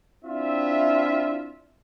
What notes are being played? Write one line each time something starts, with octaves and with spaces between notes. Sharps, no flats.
C4 D4 E4 F4 E5